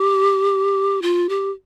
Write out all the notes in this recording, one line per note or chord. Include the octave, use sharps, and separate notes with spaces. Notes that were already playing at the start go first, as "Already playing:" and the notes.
Already playing: G4
F4
G4